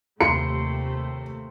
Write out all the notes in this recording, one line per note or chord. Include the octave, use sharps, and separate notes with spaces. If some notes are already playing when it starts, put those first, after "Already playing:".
D#2 C3 A3 C6 C#7